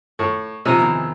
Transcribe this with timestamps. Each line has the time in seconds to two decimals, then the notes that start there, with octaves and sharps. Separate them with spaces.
0.19 A2 C#6
0.65 C3 F3 D#4 G#5 A#5
0.79 E2 D#3 E4